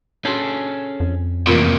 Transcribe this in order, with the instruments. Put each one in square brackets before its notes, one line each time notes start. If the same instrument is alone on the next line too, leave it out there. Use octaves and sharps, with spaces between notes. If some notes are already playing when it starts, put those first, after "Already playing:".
[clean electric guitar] C#4 G#4 A4 [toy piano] D4 F#4
[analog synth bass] F2
[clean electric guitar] E2 A2 [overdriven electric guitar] C3 A#3 [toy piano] F4 A#4